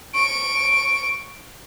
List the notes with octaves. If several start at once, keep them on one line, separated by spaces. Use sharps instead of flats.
C#6 D7